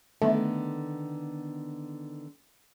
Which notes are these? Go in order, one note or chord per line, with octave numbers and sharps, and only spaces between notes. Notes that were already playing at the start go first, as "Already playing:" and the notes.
D3 D#3 A3 B3